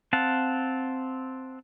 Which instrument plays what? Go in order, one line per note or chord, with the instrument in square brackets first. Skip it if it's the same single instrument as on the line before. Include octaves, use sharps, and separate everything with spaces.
[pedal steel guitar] C4 F5 F#5 A5